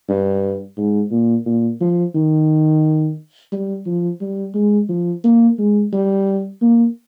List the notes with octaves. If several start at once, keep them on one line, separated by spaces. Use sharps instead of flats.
G2
G#2
A#2
A#2
F3
D#3
G3
F3
G3
G#3
F3
A#3
G#3
G3
A#3